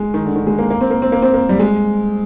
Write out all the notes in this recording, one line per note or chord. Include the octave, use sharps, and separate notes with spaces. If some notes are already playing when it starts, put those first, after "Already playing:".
Already playing: G#3
D#3
D3
D#3
G#3
A#3
A#3
C4
A#3
C4
A#3
C4
A#3
G3
G#3